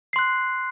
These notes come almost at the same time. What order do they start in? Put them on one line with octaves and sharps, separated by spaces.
C7 C6 F#6